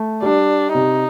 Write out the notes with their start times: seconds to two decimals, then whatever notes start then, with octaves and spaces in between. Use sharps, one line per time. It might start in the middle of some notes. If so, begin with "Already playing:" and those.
Already playing: A3
0.22 G3 D4
0.74 C3 D#4